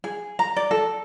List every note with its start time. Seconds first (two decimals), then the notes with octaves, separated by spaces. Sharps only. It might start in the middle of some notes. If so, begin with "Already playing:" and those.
0.04 G#4
0.39 A#5
0.56 D5
0.71 A4